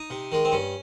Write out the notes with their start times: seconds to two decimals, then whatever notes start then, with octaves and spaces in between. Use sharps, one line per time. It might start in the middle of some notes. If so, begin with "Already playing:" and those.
Already playing: D#4
0.10 C3
0.32 D#3 G#3
0.45 C4
0.52 G2 C#4